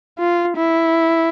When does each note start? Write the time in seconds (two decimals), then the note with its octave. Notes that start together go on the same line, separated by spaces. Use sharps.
0.19 F4
0.56 E4